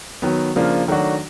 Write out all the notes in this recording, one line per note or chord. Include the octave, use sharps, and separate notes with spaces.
D#3 F#3 B3
C#3 F3 A#3 D4 F4
D#3 F#3 A3 D4 F#4